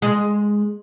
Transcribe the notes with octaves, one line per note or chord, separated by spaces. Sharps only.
G#3